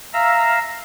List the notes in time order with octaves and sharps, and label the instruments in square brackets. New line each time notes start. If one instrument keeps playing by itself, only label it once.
[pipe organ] E5 F5 A#5 E6